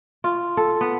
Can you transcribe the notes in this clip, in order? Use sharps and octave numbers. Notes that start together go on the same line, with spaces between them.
F4
A4
B3